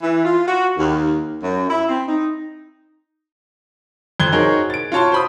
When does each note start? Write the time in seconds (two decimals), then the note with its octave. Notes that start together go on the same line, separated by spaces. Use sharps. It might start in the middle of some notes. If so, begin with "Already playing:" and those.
0.02 E3
0.24 F4
0.48 F#4
0.77 D#2
1.43 F#2
1.70 E4
1.89 C4
2.08 D#4
4.20 F2 C6 F#6 G#6 G7
4.32 D#4 F#4 G#4 A#4 C5 C#5
4.70 A6 D7
4.92 F4 F#4 C#5 A5 C6
5.12 C5 B5 D#6